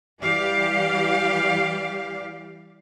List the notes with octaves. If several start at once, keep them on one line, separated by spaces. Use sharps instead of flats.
E3 G3 G4 D5 F5